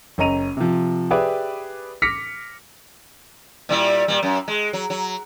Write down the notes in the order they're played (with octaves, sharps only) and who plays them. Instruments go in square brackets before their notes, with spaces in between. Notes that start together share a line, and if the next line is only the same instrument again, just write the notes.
[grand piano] F#1 C#4 D#5 A#5 D#7 F7
C3 F3
G4 G#4 B4 D5 E5
D6 F6 A#6 B6 C#7
[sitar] A#2 G3 E4
A#2 G3
F#2
G#3
F#3
F#3